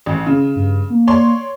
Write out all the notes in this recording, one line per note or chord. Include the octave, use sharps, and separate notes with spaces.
A1
C#3
G2
A#3
C#5 D5 C6